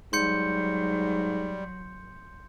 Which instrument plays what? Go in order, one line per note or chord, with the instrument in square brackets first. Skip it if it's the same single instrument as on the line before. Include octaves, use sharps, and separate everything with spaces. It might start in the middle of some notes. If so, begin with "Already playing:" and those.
[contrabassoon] G#2 [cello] F#3 [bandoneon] G3 [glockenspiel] C6 G6 C#7